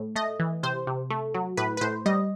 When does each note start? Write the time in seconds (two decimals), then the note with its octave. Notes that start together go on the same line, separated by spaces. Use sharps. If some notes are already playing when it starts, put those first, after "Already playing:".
Already playing: A2
0.16 A3 D#5
0.40 E3
0.63 C3 C5
0.87 C3
1.10 A3
1.34 F#3
1.57 A2 B4
1.77 B4
1.81 A2 C5
2.06 G3 D#5